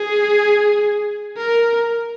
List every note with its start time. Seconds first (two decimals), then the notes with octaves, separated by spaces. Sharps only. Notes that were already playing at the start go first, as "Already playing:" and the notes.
Already playing: G#4
1.37 A#4